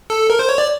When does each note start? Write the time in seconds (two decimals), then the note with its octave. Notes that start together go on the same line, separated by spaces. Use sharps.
0.10 A4
0.30 A#4
0.39 C5
0.49 C#5
0.58 D5